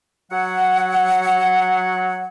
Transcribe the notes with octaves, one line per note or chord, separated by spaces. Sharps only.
F#3 F#5